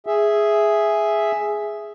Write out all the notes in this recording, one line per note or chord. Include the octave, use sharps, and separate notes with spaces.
G#4 E5